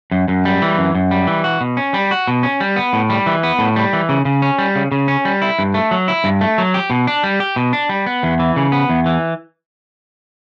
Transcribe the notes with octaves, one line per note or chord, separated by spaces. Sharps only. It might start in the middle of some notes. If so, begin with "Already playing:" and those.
F#2
F#2
G3
E3
F#2
F#2
G3
E3
F#4
B2
C#4
G3
F#4
B2
C#4
G3
B3
A2
G3
E3
B3
A2
G3
E3
C#3
C#3
C#4
G3
C#3
C#3
C#4
G3
E4
G2
A3
F#3
E4
G2
A3
F#3
G4
B2
D4
G3
G4
B2
D4
G3
B3
E2
E3
C#3
B3
E2
E3